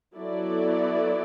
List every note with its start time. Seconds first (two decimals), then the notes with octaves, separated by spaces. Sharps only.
0.16 F#3 B3 E4 A4 D5